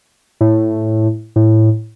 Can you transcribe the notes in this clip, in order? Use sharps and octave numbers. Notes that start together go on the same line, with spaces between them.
A2
A2